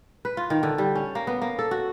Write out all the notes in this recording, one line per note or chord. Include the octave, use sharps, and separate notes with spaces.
B4
F4
D#3
D3
G3
C#4
A#3
B3
A#3
A4
F#4